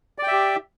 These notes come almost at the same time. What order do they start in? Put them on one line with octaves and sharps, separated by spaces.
D5 G5 E5 G4